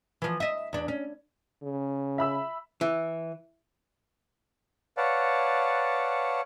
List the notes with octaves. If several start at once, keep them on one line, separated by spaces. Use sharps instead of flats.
E3 F3
D#5 E5
E2 D4
C#4
C#3
E5 B5 E6
E3
B4 C#5 D5 F5 F#5 A5